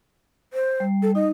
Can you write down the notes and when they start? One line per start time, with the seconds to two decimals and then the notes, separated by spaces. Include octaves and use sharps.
0.53 C5
0.80 G3
1.03 A4
1.15 D#4 D#5